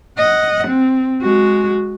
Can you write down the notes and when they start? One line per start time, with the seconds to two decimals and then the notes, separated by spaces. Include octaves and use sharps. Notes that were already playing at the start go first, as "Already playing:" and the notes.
0.18 D#5 F#5
0.67 C4
1.22 G#3 F#4